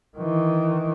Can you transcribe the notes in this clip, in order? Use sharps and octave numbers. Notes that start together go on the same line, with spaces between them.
D#3 E3